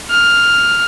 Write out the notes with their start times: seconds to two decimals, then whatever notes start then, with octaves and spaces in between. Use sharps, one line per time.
0.10 F6